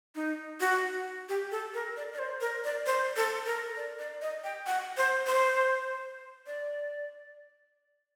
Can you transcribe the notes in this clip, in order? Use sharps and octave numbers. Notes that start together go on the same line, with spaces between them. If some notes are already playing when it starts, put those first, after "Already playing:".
D#4
F#4
G4
A4
A#4
D5
D5
C5
A#4
D5
C5
A4
A#4
D5
D5
D#5
G5
F#5
C5
C5
D5